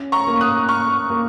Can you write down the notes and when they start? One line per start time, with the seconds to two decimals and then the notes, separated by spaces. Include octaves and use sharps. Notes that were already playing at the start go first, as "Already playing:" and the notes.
Already playing: C#4
0.12 A#5 C#6
0.27 A#3
0.41 D#6 F#6
0.69 A#3 C#6 F6
1.10 A#3